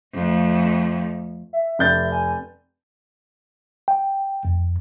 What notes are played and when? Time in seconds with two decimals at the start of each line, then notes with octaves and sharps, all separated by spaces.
0.13 F2 A3
1.53 E5
1.79 F1 G6 A6
2.12 G#5
3.88 G5
4.45 F2